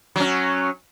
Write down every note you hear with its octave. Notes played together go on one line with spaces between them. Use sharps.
F#3 C#4